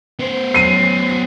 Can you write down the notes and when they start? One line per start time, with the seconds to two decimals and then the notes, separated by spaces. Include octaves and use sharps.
0.19 B3 C5
0.54 F#3 C7 D#7